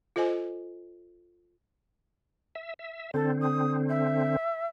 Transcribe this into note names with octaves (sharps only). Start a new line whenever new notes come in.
F4 A4 C5 D#5 G#5
E5
E5
D3 C4 A4
D#6
E5